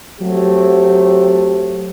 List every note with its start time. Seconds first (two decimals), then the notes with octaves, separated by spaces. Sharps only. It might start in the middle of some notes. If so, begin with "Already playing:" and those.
0.20 F#3 A3 C4 G4